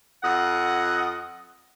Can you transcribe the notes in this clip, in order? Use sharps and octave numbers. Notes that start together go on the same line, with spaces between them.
F2 D#5 F#5